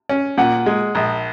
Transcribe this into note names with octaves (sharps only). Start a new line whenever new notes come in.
C#4
A#2 F#5
G#3
A#1